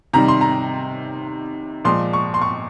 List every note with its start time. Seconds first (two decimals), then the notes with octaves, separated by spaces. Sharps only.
0.13 C3 D#3 G3 A#5
0.28 C6
0.41 A#5
1.85 A#2 F3 G#3 C6
2.13 C#6
2.34 C6
2.42 C#6